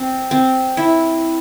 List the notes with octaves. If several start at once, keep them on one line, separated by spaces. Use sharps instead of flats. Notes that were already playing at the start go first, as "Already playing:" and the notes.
Already playing: C4
C4
E4